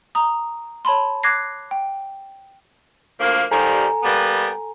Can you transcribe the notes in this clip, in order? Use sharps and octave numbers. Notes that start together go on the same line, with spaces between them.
A#5 D#6
C#5 A5 B5 C6
D6 F#6 G#6 A#6 C7
G5
D2 F3 A#3
D#3 F3 G3 A4 G#5 A#5
G3 A#3 B3